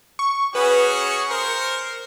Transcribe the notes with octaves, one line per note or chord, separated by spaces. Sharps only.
C#6
C#4 F#4 G#4 B4
C#7
A#4 C5